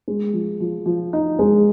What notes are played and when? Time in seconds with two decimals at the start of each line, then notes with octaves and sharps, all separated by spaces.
0.08 G#3
0.34 F3
0.60 F3
0.86 F3
1.13 D#4
1.39 G#3